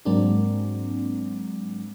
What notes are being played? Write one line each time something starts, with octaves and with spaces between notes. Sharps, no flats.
G#2 F#3 G#3 A#3 C4 D4